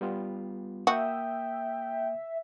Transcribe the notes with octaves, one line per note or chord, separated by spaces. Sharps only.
G3 B3 F4
A#3 F#4 E5 G5 D#6